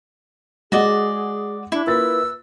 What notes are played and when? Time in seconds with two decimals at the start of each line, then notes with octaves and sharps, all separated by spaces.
0.72 G#3 F#4 G#4 D5 D#5 F#5
1.72 D4 E4
1.87 A#3 F4 B4 E6 A6